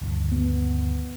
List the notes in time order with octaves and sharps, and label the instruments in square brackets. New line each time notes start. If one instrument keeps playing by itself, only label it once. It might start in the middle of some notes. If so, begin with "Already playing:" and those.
[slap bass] D2 G2 D#3
[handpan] B3